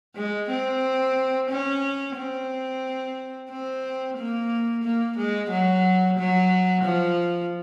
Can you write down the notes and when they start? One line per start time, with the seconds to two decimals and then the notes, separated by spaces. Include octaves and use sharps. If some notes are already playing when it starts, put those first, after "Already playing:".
0.16 G#3
0.50 C4
1.50 C#4
2.16 C4
3.50 C4
4.17 A#3
4.83 A#3
5.18 G#3
5.50 F#3
6.17 F#3
6.84 F3